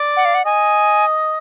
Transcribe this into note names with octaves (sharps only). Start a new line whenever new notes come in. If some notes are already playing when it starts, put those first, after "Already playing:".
Already playing: D5
F#5
F5
F#5
D#5 G#5